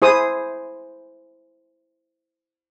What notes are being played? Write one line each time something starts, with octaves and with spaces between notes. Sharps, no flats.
E4 G#4 C5 D#6